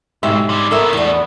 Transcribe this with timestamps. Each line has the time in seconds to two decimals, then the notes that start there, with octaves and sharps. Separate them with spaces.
0.23 B1 G#2 G4 E5
0.49 G3 G#3
0.71 A2 B3 A4 A#4 E5
0.93 E2 D4